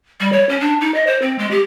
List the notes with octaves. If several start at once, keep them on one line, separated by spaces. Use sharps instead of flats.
G3
C#5
C#4
D4
D#4
D#5
C5
C4
G#3
G4